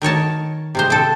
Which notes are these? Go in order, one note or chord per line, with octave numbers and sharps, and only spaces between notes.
D#3 A#4 C#5 A5
C3 G#3 C5
C4 A4